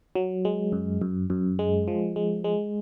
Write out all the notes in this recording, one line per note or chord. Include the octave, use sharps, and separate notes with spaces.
F#3
G#3
F#2
F#2
F#2
G#3
F3
G#3
G#3